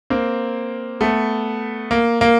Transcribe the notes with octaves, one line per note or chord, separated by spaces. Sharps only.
A#3 C4
A3 B3
A#3
A#3